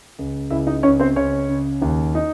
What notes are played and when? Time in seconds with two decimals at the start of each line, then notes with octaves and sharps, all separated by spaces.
0.19 C#2
0.50 C#2 E4 E5
0.67 D#4 D#5
0.83 C#2 C#4 C#5
1.00 C4 C5
1.16 C#2 C#4 C#5
1.49 C#3
1.82 D#2
2.15 D#4